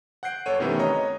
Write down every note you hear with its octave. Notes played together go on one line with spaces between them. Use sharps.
F#5 F#6 G6 C7 D7
G1 A4 C#5 D#7
C3 D#3 E3 A3 B3 C#4
C#5 D#5 A#5 D#6